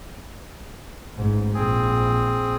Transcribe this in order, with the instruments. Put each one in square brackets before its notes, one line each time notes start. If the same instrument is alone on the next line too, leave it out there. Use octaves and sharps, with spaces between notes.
[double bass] A1 G#2
[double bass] A#1 [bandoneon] C4 G#4